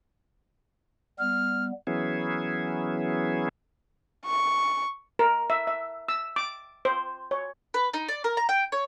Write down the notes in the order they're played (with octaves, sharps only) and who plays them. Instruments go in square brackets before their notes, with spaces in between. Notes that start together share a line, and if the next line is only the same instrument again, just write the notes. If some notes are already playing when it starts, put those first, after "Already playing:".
[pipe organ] G3 B3 [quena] F6
[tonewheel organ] E3 F#3 B3 C#4 E4 G#4
[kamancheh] C#6
[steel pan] A#4
E5
E5
E6
D6
C5
C#5
[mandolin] B4
D#4
D5
A#4
A#5
G5
C#5